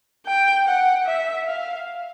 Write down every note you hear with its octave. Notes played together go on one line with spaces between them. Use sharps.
G5
F#5
E5
F5